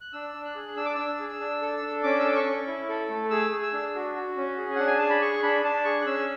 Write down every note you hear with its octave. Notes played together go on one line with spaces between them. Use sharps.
F#6
D4 E6
D4
F#6
G#4
D4 E6
D6
D4 E6
G#4
D4
A4
D4
C#4 D6
E6
A4 D6
C#6
C#4
E4
A4
A3
G#4 E6
G#4
E6
D4
F#4
F#4
C#4
G#4
D4 F#5
G#5
G#4 A5
B5
G#4 C#6
D4 B5
D4 A5
G#4 C#6
F#6
C#4 E6